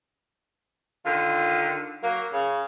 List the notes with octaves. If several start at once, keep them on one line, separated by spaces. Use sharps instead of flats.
D3 D#3 F4
F#3 A#3
C#3